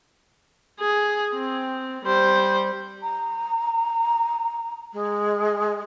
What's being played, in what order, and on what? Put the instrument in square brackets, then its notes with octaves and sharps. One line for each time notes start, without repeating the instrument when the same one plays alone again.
[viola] G#4
C4
G3 C5
[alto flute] A#5
G#3